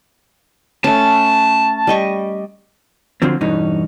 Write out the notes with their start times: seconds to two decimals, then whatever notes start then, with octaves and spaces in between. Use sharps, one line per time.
0.84 A3 C#4 A5
1.87 G3 D#5 C#6
3.22 D3 F3 F#3 C4
3.41 E2 G2 B2 E3 C#4 D#4